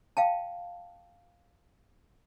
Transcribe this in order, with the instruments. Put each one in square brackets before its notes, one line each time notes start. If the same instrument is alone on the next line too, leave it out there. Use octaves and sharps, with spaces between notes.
[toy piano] F5 G5 A5